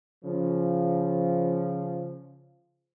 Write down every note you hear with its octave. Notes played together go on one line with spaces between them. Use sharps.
C#3 F3